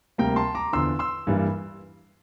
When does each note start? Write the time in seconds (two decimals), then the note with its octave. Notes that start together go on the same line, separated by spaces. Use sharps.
0.18 D2 C3 G3 A#3 G5 A#5
0.36 A5 C6
0.55 A#5 D6
0.73 E2 D3 F3 C6 E6
0.99 C6 E6
1.27 G2 E3 G3 A#3